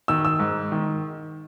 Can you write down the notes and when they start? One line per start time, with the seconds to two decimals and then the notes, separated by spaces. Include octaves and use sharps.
0.08 D#3 E6
0.25 E6
0.40 G#2
0.72 D#3